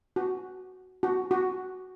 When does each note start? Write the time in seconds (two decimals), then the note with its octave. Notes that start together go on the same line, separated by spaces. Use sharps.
0.16 F#4
1.03 F#4
1.31 F#4